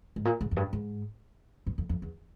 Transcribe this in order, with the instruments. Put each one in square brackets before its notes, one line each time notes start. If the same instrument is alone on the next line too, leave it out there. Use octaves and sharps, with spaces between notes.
[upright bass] G#2
A#2
G#2
F2
G2
G#2
G2
F2
F2
E2